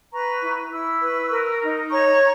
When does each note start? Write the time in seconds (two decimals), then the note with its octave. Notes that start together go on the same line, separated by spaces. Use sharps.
0.12 B4 A#5 C#6
0.43 E4
0.72 E4 C#6 E6
1.01 B4
1.31 A#4
1.61 D#4
1.90 C#5 A#5 C#6